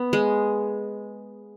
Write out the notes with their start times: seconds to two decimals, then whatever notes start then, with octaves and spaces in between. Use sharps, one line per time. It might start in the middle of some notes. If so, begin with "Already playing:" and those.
Already playing: B3
0.13 G#3